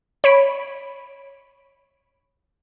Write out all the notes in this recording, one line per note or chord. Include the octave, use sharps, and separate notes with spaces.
C#5 B5 D7